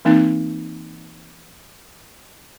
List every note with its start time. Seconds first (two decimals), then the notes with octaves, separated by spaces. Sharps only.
0.05 E3 A#3 C4 D#4